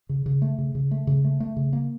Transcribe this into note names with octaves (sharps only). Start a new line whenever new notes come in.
C#3
C#3
A3
C#3
C#3
A3
C#3
A3
A3
C#3
A#3